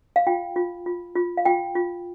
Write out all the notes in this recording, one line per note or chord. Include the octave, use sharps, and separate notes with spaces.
F5
F4 G5
F4
F4
F4
F5
F4 G5
F4